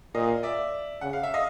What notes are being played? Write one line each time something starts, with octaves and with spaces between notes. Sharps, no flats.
A#2 D#5 F5
D5 E5
C#3 F#5
F5
E5
D#5 F5